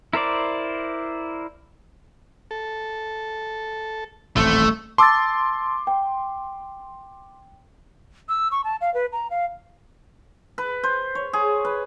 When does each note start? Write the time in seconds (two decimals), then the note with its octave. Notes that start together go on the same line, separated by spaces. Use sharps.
0.13 E4 A#4 C5 D5
2.51 A4
4.36 D#1 A1 A3 C4
4.98 A5 C6 D6 E6 A6
5.87 G5
8.29 E6
8.51 C#6
8.64 A5
8.81 F5
8.94 B4
9.13 A#5
9.31 F5
10.58 B4
10.83 C5
11.15 C#5
11.33 G#4
11.65 B4